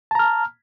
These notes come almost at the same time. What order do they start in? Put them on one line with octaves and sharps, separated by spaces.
A5 A#5 F6